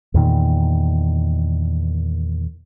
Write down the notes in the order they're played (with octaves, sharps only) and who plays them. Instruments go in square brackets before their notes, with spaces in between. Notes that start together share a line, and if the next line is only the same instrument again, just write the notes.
[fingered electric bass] E2 A#2 D#3